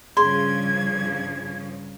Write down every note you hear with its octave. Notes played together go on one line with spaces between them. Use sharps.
G2 C#3 F3 G#4 C6 G#6